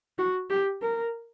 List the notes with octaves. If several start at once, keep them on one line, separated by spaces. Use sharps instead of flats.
F#4
G4
A#4